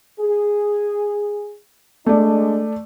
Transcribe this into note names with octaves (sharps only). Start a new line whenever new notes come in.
G#4
G#3 A3 D4 D5